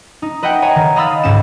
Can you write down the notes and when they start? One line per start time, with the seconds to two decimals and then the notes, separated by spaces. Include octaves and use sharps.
0.22 D#4
0.42 B4 D#5 E5 F#5 G5
0.62 C#5 G#5 A#5
0.75 D#3
0.96 D#5 F5 B5 D#6 E6 A6
1.24 C#2 G#2 C#4 E7